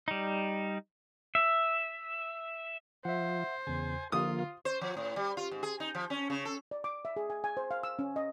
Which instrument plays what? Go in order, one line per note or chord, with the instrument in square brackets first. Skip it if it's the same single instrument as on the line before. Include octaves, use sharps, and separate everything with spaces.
[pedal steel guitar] G3 D#4
E5
[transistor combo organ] F3 [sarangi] C5 [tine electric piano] E5 F#5
[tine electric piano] E2 C#3 [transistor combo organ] G#5
[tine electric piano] D3 [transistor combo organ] F3 A#3 [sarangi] F4 [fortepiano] D#6
[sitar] C5
F3
A2
G3
F4
G#2
G#4
D#4
F3
C#4
C#3
A4
[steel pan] D5
D6
E5
G#4
G#5
G#5
C5
F5
E6
C#4
D#5